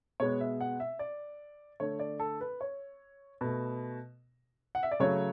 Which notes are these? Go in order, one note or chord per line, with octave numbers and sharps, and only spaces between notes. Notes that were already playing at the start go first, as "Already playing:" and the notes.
B2 G#3 B3 C#5
E5
F#5
E5
D5
D3 A3 C#5
D5
A4
B4
C#5
B2 A3
F#5
E5
D5
C#3 F#3 A3 C#5